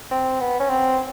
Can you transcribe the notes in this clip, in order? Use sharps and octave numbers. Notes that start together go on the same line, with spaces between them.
C4
B3
C#4
C4